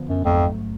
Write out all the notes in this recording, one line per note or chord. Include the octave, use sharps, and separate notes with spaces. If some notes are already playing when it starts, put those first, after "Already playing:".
Already playing: D3 F3 B3
F#2
A1 F2 G#2 F#3 A3